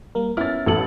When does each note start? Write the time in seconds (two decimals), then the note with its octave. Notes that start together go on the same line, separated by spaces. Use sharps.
0.15 G3 A#3 A#4
0.37 B3 C#4 E4 F6 A6
0.66 A1 A4 F#7